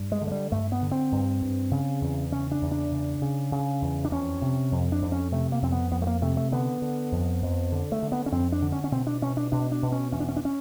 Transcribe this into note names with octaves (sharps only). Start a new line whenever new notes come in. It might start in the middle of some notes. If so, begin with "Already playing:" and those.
Already playing: G2
G#3
D3
G#3
G3
G2 A3
B3
D3
C4
G2
G2
C#3
E2
C#3 C#4
D4
E2
D4
C#3
C#3
C#3
E2
D4
F2 C#4
C3
F2
D4
F2
C#4
C3 A3
A#3
F2 C4
B3
F2 B3
A3
A#3
C3 A3
A3
D3 B3
D3
F2
F2
D3
A3
D3
B3
C#4
F2 C4
D4
D3
C#4
C#4
B2 C4
D4
B2 C#4
D4
B2 D4
D4
B2
C#4
E2 C#4
D4
C#4
D4
C#4